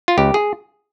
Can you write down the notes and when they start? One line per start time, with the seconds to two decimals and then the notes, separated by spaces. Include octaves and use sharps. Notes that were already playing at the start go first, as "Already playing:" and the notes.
0.08 F4
0.18 C#2 G4
0.34 G#4